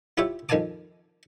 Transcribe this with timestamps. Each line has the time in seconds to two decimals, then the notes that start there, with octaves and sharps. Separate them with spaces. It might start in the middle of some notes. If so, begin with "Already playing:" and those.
0.18 E4 F4 G4 C#5 E5
0.49 F2 D#3 F5 G#5 A5 D6